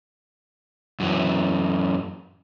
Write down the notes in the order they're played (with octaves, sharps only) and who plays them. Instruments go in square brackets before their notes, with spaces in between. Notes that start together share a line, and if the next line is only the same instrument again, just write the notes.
[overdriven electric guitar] F#2 E3